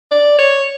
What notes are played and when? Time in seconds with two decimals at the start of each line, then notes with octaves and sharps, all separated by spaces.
0.11 D5
0.39 C#5